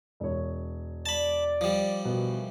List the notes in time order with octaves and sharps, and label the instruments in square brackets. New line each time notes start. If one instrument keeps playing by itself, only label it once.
[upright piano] E1 C#5
[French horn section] D5 [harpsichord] A5 B5
[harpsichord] F3 G3
[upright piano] B2 [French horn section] D#3 E3